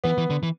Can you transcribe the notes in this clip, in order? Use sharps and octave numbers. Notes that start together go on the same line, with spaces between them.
E3 B3
E3
D3
E3